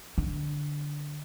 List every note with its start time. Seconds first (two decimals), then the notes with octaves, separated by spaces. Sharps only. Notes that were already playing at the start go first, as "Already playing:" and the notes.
0.18 D3